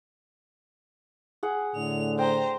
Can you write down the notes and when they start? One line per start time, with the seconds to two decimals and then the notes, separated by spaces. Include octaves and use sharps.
1.43 G#4 F#5 G#5
1.76 A2 D3 F7
2.19 C5 G5 A#5